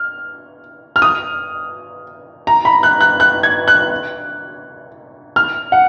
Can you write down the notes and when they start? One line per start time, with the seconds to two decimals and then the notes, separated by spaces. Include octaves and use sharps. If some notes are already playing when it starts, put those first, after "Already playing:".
Already playing: F6
0.96 F6
1.02 D#6
2.47 A#5
2.65 B5
2.83 F#6
3.01 F#6
3.20 F#6
3.43 G#6
3.68 F#6
5.36 F6
5.72 F#5